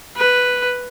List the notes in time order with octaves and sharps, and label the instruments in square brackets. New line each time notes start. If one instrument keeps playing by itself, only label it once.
[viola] B4